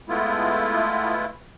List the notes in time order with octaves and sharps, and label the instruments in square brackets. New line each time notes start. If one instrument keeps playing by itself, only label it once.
[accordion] G#3 A3 B3 E4 F4